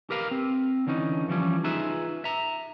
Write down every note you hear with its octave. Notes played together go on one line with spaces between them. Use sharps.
G4 A#4 B4 F5
C4
D3 E3 C#4 D#4
E3 F3 G3 C#4
D#4 F4 G#4 B4 E5
E5 A#5